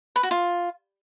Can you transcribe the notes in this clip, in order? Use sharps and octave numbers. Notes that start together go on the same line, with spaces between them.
B4
F#4
F4